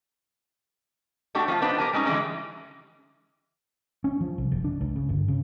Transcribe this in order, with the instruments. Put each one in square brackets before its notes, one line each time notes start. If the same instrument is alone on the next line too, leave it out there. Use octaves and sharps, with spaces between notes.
[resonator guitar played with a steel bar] A3 D4 F#4 G4 A4
F3 F4 D5 F5
B3 D4 D#4 B4 C5
G4 A#4 G#5
G3 G#3 C#4 D#4
D3 E3 G3 G#3 C#4
[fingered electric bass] C#4
F3
C2
F#1
D4
C#2
C#3
G1
C#3